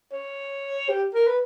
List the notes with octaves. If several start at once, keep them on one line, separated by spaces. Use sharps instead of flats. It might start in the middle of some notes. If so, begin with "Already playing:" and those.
C#5
G4
A#4
B4